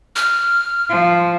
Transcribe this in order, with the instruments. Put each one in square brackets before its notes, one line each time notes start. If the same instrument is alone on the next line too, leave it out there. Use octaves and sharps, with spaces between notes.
[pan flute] F6
[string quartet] F3